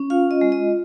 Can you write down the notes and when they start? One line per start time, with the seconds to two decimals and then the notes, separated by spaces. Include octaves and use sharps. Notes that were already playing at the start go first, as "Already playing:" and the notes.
Already playing: C#4
0.10 F4 F5
0.31 D#5
0.41 G#3
0.52 D#5